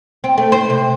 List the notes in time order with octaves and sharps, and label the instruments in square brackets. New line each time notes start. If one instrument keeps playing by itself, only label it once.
[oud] C4
A3
C5
C3